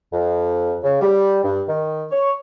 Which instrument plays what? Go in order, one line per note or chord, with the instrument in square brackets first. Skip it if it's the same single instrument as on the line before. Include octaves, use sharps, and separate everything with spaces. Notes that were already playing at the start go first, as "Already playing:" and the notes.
[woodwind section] F2
C#3
G3
G2
D#3
C#5